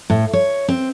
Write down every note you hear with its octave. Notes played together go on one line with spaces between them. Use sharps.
A2
C#5
C4